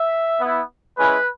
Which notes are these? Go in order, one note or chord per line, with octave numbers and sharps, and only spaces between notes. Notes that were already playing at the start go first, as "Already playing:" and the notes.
Already playing: E5
B3 E4
G#3 C#4 E4 B4